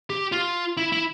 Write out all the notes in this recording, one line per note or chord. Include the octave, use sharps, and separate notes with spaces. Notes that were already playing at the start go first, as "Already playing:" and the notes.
G4
F4
E4
E4